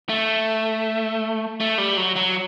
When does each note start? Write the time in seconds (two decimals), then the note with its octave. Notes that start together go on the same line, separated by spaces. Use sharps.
0.09 A3
1.60 A3
1.78 G3
1.97 F#3
2.16 F#3